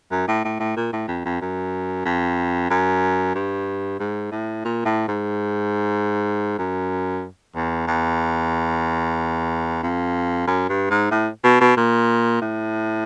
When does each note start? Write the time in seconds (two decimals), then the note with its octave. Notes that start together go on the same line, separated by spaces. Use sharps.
0.11 F#2
0.28 A2
0.44 A2
0.59 A2
0.76 A#2
0.92 A2
1.08 F2
1.25 F2
1.41 F#2
2.05 F2
2.70 F#2
3.35 G2
3.99 G#2
4.31 A2
4.65 A#2
4.85 A2
5.08 G#2
6.58 F#2
7.55 E2
7.87 E2
9.82 F2
10.47 F#2
10.69 G2
10.90 G#2
11.11 A2
11.44 B2
11.60 B2
11.76 A#2
12.41 A2